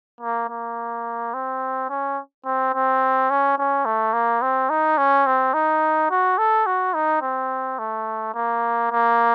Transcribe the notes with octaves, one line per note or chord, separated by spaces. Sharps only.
A#3
A#3
C4
C#4
C4
C4
C#4
C#4
A3
A#3
C4
D#4
C#4
C4
D#4
F#4
A4
F#4
D#4
C4
A3
A#3
A#3